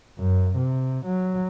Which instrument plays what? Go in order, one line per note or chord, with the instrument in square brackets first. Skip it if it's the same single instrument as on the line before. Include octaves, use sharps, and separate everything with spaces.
[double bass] F#2
C3
F#3